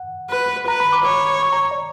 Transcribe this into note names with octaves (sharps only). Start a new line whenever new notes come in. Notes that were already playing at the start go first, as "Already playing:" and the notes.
Already playing: F#5
B4
B4 A#5
B5
D6
C#5 D6
C#6
A#5
D5